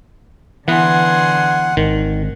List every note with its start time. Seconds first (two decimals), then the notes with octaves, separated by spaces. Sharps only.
0.68 D3 E3 B3 G#4 F#5 C6
1.77 G#1 D#3